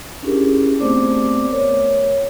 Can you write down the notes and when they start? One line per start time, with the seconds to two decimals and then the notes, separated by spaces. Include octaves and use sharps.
0.22 C#4 D4 E4 G4 G#4 A#4
0.80 A3 B3 C4 C5 D5 D6
1.50 A#4 C#5